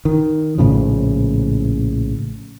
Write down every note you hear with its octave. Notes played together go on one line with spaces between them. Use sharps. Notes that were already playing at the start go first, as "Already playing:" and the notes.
D#3
A#1 A2 C#3 F3